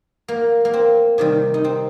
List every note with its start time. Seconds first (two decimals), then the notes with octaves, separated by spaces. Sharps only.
0.28 A#3
0.65 A#3
0.74 C4
1.18 C3 D#3 G3
1.54 D#4
1.64 C4